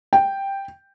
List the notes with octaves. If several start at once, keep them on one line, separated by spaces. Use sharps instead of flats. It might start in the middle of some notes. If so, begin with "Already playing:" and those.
G5